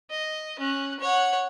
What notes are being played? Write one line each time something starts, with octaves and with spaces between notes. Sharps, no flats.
D#5
C#4 F#6
C#5 F#5